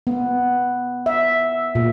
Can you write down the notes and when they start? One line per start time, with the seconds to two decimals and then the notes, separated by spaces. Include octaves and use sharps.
0.07 B3
1.06 E5
1.75 A#2